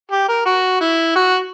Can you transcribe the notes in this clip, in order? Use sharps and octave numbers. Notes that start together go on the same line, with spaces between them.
G4
A#4
F#4
E4
F#4